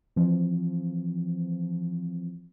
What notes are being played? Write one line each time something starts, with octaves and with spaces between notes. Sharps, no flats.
E3 F3 C4